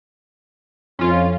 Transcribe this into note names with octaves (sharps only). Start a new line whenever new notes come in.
F2 C#4 F4